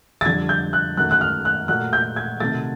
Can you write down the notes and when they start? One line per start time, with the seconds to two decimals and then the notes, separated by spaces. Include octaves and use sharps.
0.21 A6
0.25 F2 D3 G3 G#6
0.49 G6
0.73 F#6
0.97 F#2 D#3 F#3 A3 F#6
1.11 F#6
1.21 F6
1.45 F#6
1.68 A#2 F#3 A3 F#6
1.93 G6
2.16 G#6
2.40 C3 D#3 F#3 A3 A6